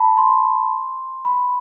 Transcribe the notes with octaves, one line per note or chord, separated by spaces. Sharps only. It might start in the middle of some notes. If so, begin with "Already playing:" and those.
Already playing: A5 B5
C6
B5